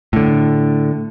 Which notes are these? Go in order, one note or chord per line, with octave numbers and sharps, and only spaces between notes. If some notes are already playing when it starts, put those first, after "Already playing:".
A2 D3